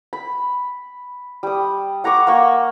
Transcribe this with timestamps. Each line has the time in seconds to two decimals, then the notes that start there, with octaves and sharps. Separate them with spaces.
0.13 B5
1.43 G3 D#6
2.04 F#5 A#5 C#6 D6
2.27 A#3 C#6